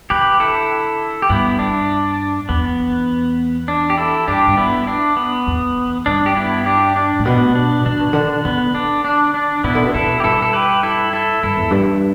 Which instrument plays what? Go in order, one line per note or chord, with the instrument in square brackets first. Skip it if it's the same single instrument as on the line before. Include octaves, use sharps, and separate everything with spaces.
[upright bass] D3 [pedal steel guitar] G4 B4
[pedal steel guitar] E4 A4
G4
[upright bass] G2 [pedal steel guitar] B3 E4
[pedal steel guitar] D4
[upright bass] E2 [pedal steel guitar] B3
[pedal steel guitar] D4
G4
E4 A4
[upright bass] G2 [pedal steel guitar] D4 G4
[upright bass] G2
[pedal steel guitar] B3 E4
D4
B3
[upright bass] E2
[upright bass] G2 [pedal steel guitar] D4
[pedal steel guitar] G4
B3 E4
D4 G4
D4
[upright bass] A2
[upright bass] B2 [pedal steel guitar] B3
[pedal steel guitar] D4
[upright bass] D3 [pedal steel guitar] D4
[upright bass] B2
D3
[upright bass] D3 [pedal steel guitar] B3
[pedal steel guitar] D4
D4
D4
[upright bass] B2 [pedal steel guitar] B3 E4
[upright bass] D3
B2
[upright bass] D3 [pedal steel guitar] E4 A4
[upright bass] B2
[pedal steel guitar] G4
[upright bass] G2 [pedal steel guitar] E4 A4
[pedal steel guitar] A4
G4 B4
E4 A4
E4 A4
[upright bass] G2 [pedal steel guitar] E4 A4
[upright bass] E2
G2